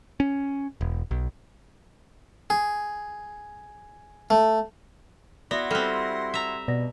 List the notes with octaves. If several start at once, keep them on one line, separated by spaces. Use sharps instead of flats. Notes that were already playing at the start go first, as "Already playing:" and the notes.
C#4
E1
B1
G#4
A3
B3 E4 F#4 D5 C6 A#6
G3 C4 A4 F6 F#6
E5 A#5
B2 D5 A#6